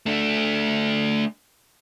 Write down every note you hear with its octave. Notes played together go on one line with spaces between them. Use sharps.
A3 D4